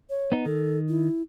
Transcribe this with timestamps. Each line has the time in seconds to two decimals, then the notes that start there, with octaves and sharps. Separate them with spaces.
0.10 C#5
0.32 B3 D#4
0.46 D#3 A4
0.89 E4